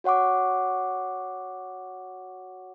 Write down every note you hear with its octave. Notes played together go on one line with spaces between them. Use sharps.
F#4 C#5 F#5 C#6 D6